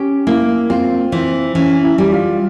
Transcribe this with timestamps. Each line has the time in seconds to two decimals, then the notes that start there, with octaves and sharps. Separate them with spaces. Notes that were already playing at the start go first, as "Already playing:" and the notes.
Already playing: C#4 G4
0.27 A#3 E4
0.70 C4 F4
1.12 E3 C4
1.55 E3 C#4
1.84 E4
1.98 G3
2.12 F4